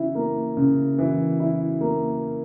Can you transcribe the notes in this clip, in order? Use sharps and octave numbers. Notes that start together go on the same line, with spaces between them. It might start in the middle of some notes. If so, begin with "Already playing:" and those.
Already playing: C#3 E3 E4
A#3
C#3
E3
E4
A#3